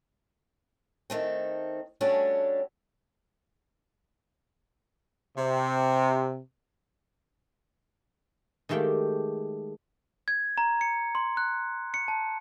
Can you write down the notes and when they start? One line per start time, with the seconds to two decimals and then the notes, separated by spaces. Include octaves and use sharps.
1.10 D#3 A3 C4
2.01 G3 A3 C#4 D4 F#4 G4
5.37 C3
8.69 D#3 G#3 A3 G4 G5
10.28 G#6
10.58 A#5
10.81 C#7
11.15 C6
11.37 F#6
11.94 C#7
12.08 A5